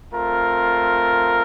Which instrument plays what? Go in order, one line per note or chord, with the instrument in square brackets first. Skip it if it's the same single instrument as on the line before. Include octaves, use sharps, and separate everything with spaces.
[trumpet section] A3 C4 F4 A#4